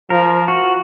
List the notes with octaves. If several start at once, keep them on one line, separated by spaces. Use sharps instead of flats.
F3 A#4
F#4